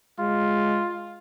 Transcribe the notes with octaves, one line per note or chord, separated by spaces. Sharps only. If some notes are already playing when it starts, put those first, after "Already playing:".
G#3 F4